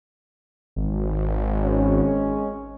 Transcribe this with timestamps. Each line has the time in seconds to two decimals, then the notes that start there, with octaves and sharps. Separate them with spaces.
0.76 G#1
1.64 G#3 C#4